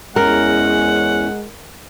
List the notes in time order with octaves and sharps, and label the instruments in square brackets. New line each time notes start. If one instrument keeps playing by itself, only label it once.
[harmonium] E2 C#4 [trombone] G#3 [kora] A#4 [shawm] F#5